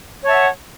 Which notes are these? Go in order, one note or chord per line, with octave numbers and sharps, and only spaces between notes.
C#5 E5 F#5 A5